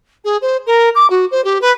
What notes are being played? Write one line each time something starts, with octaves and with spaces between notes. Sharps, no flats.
G#4
C5
A#4
D6
F#4
C5
G4
B4